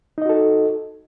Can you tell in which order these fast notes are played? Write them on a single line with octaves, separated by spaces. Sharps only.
D#4 D#5 F#4 A4